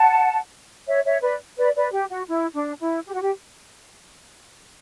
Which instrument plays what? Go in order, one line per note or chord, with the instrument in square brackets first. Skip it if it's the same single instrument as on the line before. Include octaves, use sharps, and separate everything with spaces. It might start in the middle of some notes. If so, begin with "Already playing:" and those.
Already playing: [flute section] F#5 A5
C#5 E5
C#5 E5
B4 D5
B4 D5
B4 D5
G4
F#4
E4
D4
E4
G4
F#4
G4